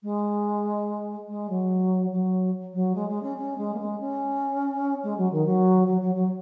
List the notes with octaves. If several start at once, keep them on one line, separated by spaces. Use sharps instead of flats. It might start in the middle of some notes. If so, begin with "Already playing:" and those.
G#3
G#3
F#3
F#3
F#3
G#3
G#3
C#4
C#4
G#3
A#3
G#3
C#4
G#3
F#3
D#3
F#3
F#3
F#3
F#3